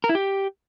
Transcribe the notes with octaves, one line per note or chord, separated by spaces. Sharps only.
A#4
E4
G4